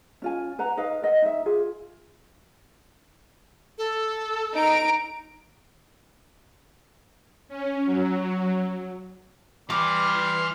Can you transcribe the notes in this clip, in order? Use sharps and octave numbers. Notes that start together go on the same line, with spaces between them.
C#4 F4 G#5
B4 F#5 A#5
D#4 B4 F5
A#4 D#5 F#5
D#4 E5
F4 G#4
A4
D#4 A#5 D7
C#4
F#3
E3 G3 C6 D6 F6